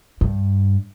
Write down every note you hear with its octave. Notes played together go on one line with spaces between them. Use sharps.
G2